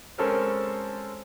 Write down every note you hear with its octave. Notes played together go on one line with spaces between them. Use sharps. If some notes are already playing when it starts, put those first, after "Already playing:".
G#3 C4 C#4 A4 A#4 C5